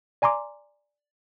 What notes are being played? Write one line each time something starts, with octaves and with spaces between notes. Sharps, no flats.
D5 G#5 A#5 C6 D6